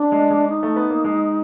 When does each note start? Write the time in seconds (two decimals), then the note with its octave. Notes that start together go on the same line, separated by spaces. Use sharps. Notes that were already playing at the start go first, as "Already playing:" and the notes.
Already playing: D4
0.12 G#3
0.31 G#3
0.49 D#4
0.63 A3
0.76 B3
0.90 A#3
1.04 G#3